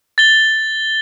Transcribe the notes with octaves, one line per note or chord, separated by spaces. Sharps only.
A6 G7